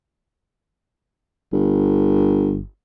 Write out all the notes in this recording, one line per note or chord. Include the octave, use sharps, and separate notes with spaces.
G1